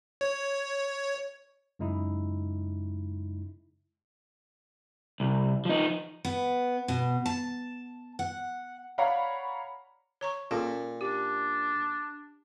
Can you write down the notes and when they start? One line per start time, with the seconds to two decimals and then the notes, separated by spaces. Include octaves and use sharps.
0.21 C#5
1.79 F#2 C#3 G#3 D#4 E4
5.20 C2
5.65 F3 D#4
6.25 B3
6.88 B2
7.26 A5
8.19 F#5
8.98 C#5 D5 F5 F#5 A#5 B5
10.21 C#5 A#5 C#6
10.51 A#2 C#4 G#4 A4
11.01 D4 G4